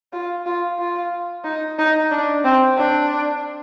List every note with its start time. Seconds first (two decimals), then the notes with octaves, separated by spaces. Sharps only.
0.13 F4
0.46 F4
0.79 F4
1.44 D#4
1.78 D#4
2.11 D4
2.44 C4
2.77 D4